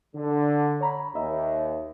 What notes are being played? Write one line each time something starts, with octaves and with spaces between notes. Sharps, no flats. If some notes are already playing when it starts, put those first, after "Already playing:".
D3
C#5 A#5 B5
D#2 D#5 E5